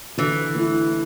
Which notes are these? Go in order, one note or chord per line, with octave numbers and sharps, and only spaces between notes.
D3 E3
A3 E4